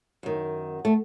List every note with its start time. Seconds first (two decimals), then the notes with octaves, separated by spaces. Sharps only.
0.23 F#2 D#3
0.85 A3